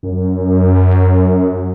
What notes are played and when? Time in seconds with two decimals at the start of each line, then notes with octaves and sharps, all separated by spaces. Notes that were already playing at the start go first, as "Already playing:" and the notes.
0.03 F#2